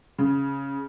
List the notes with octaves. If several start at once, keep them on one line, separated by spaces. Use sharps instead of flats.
C#3